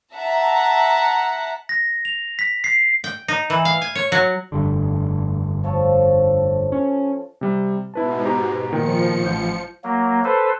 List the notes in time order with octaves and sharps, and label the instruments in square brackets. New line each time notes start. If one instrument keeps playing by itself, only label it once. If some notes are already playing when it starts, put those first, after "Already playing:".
[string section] E5 F#5 A5 A#5
[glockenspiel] A#6
F7
B6
C7
[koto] G5
D#4
E3
F5
G#5
C#5
F#3
[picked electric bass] F1 G2 D3
[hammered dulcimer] F3 A4 C#5
[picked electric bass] C#4
[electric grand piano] C3 G3
[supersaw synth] G#2 B2 [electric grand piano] E4 B4 A5
[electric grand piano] G4 A#5
[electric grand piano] A#2 D#3 G5 [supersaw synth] F3 C#7
[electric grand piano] A1 G6
[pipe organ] F#3 A#3
A4 B4 C5